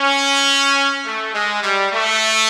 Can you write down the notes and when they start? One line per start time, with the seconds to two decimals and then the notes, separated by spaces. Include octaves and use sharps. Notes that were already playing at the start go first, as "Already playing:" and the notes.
Already playing: C#4
1.06 A3
1.33 G#3
1.62 G3
1.91 A3